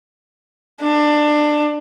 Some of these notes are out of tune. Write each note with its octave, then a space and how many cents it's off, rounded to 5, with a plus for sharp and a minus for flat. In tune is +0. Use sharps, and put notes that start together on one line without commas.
D4 +20